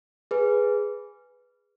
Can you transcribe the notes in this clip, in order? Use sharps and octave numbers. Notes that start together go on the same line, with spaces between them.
G#4 B4